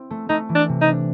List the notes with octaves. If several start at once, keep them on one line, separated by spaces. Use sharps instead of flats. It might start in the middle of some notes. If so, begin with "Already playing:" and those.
Already playing: C4 E4
A3
A3 D#4
E3
D4
C3
D#4
D4